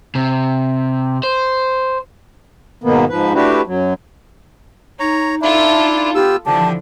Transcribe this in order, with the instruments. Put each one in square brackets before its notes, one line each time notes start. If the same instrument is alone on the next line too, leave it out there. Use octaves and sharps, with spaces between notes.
[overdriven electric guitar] C3
C5
[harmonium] G#2 B2 D#3 A#3 B3
G#2 F3 B4
A3 D4 E4 F#4 G4 B4
F#2 F#3
[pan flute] D#4 [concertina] C#5 A#5
[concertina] D4 E4 [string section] F4 A4 [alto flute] E5
[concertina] B3 F4 E6 [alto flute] G4
[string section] D3 E3 F3 [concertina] G4 [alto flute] A5